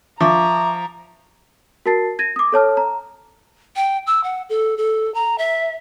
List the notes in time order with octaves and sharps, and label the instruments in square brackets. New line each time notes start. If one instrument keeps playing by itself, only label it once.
[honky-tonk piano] F3 [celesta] E5 C#6 D6 [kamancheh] A#5
[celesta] F#4 A#4 A5 A6 C7
G#6 A#6 D#7
D6 D#6
A4 C#5 A5 F6
A#5
[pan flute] G5
E6
F#5
A4
A4
A#5
E5